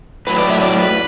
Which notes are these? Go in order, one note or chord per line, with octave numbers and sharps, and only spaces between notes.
A2 F#3 B4
D5
E5
D5
B4